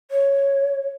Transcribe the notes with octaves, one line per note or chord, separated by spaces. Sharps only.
C#5